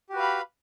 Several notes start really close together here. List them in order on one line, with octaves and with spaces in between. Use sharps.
G4 F#4 B4 F5 B5